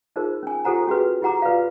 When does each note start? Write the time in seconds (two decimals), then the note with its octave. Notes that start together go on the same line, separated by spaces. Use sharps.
0.16 D#4 F4 G#4 A#4 C5
0.43 C#4 G#5
0.65 F4 G4 A4 C5 F#5 A#5
0.87 C#4 F#4 G#4 B4
1.22 E4 G4 F#5 A#5 D6
1.42 F4 B4 D5 F5